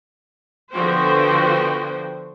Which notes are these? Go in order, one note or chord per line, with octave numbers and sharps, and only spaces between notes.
D3 F3 B3 F#4 C5 G5